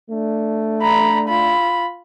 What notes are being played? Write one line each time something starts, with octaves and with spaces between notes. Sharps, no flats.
A3 D4
A#5 B5
F4 B5